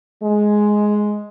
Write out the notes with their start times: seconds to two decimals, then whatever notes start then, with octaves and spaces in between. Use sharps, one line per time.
0.22 G#3